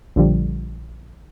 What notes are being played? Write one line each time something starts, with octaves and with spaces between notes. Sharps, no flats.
A#1 D3 F3 G3